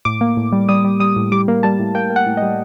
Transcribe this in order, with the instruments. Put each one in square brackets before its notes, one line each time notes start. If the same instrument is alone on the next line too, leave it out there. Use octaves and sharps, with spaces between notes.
[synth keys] A2 D6
A#3
A2
G3
G3 D#6
G3
G3 D#6
A2
G3 D6
A#3
G3 A5
A2
A#3 G5
A#3
F#5
A2
D#5
G3